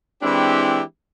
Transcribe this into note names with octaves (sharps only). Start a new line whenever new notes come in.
E3 G#3 C4 D4 E4 G4